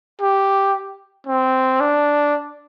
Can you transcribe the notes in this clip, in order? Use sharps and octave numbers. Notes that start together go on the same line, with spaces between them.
G4
C4
D4